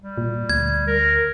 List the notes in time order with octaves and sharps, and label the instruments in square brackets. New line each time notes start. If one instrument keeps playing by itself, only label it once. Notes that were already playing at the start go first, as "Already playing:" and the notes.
[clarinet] G3
[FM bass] A#2
[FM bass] D2 [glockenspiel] G#6
[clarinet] A#4